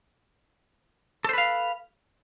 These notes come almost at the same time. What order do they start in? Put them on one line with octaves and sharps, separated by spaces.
A4 C5 B4 F5